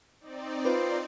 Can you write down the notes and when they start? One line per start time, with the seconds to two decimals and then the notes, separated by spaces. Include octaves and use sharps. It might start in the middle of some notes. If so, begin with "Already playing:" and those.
0.20 C4 D#4 D5
0.65 F4 B4 C5